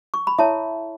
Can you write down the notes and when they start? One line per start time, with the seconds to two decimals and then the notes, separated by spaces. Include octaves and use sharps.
0.14 C#6
0.27 B5
0.39 E4 A4 C#5 E5 A5